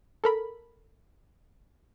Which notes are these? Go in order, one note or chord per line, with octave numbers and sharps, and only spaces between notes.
A4 A#4 B5